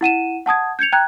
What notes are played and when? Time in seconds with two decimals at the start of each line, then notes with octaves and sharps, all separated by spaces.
0.01 E4 F#5 D#7 E7
0.46 F#5 A5 D#6 G#6
0.79 G6 G#6 C#7 F7
0.92 G5 A#5 F#6 G#6